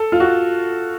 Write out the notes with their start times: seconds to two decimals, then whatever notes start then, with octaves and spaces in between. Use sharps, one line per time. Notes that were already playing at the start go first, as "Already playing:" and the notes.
Already playing: A4
0.12 F4
0.20 F#4